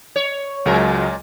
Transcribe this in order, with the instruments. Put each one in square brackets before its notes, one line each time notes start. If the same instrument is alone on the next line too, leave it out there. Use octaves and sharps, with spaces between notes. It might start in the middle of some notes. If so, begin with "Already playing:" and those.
[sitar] C#5
[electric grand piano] C#2 F#3 [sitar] A#2 G#3 A#4